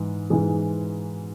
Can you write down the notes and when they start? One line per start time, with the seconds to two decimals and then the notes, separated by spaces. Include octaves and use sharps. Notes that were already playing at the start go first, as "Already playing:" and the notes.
Already playing: G#2 E3
0.30 G#2 E3 G#3